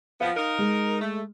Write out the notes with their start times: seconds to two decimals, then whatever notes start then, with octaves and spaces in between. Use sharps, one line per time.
0.21 F3 B3 F5
0.36 D#4 A#4
0.59 G#3
1.01 A3